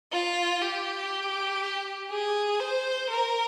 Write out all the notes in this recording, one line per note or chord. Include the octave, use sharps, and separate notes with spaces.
F4
G4
G#4
C5
A#4